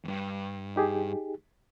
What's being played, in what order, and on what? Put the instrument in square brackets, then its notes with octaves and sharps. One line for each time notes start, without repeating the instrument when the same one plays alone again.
[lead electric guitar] E2 G2
[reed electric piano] D#4 G4 G#4